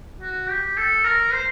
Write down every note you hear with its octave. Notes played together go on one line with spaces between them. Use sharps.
F#4
G4
A4
A#4
C5